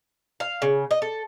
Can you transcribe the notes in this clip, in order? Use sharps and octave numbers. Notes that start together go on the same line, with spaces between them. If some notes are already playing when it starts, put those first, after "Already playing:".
F5
C#3
D#5
A4